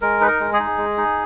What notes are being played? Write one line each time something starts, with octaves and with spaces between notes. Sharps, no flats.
G#3 A#4
D#4 B4
A#4
G#3
G#4
D#4
G#3
D#4